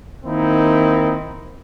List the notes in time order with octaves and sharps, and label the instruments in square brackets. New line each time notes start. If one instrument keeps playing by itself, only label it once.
[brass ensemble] D#3 A#3 C4 D#4 E4